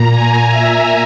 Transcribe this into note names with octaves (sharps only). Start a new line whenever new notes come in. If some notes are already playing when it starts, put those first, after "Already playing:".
Already playing: A#2 A#5
G#5
E5